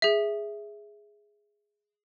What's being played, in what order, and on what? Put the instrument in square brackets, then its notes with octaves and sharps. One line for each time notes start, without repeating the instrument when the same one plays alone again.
[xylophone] G#4 E5